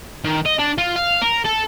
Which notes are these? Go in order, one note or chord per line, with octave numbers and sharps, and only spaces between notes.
D#3
D#5
D4
F4
F5
A#4
A4